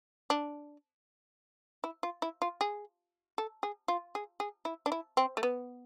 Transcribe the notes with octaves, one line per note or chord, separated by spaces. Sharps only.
D4
E4
F4
E4
F4
G#4
A4
G#4
F4
G#4
G#4
E4
D4
E4
C4
A3
B3